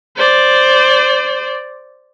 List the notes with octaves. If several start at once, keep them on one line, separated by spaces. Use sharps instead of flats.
C5 D5